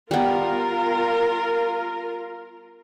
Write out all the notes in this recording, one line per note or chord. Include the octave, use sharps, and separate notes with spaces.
G3 B3 F4 A#4